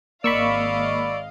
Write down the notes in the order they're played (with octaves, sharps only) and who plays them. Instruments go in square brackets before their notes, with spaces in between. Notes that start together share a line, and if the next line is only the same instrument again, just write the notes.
[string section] G#1 D#5 F5 [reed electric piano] A#3 [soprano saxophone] D5 [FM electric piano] B5 C#6 E6